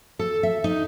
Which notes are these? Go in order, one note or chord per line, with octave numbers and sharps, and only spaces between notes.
A4
E5
D#4